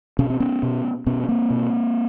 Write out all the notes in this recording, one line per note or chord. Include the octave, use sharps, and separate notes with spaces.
B2 C#4
C4
B3 C#4
B2
B2 B3 C#4
C#4
A#3 C4
B2